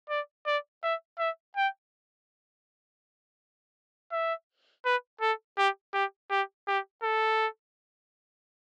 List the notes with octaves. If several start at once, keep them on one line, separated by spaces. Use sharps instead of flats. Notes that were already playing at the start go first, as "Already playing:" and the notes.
D5
D5
E5
E5
G5
E5
B4
A4
G4
G4
G4
G4
A4